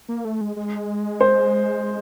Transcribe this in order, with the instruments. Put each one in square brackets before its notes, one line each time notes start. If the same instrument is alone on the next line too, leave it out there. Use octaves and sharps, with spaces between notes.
[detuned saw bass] A#3
A3
G#3
G#3
[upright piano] C5